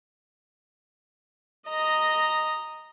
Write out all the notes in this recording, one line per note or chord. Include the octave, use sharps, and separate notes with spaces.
D#5 A#5